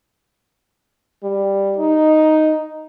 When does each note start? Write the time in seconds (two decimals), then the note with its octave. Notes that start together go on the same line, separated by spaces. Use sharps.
1.23 G3
1.77 D#4